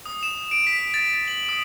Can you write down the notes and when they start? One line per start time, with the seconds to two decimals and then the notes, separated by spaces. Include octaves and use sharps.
0.06 D#6
0.23 E7
0.51 D7
0.67 B6
0.94 A6
1.28 F#7
1.49 D#6